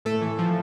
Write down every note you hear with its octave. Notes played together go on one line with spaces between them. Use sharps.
A2 A3 A4
E3
F3